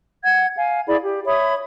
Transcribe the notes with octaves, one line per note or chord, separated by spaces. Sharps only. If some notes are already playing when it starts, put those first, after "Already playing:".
F#5 G#6
F5 G#5
E4 G#4 D5 B5
G4
C#5 E5 B5 D#6